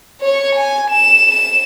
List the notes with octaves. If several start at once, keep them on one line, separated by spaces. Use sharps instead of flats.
C#5 C#6
G#5
E7
E7